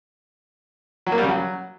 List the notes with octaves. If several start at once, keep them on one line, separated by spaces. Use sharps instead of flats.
F#3
A#3
G3
C#3
F#3